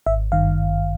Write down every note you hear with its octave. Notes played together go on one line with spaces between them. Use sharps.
G#1 E5
G2 D#3 F5